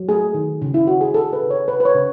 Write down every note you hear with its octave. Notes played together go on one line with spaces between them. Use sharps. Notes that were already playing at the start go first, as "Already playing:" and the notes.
Already playing: F#3
A3 G#4
D#3
C#3
E4
C#3 F#4
G#4
C#3 A4
B4
C#3
C#5
C#3 B4
B4
C#5
C#3